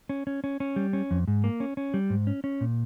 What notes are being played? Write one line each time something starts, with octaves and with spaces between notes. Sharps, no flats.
C#4
C#4
C#4
C#4
G3
C#4
F2
G#2
A#3
C#4
C#4
G3
G#2
C#4
C#4
A#2